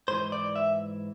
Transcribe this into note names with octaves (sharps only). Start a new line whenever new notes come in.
G#2 E3 C5
D5
E5